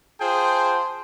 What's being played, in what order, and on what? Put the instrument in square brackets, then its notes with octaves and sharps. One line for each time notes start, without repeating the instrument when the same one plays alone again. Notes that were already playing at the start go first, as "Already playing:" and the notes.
[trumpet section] F4 G#4 C5 G5 A5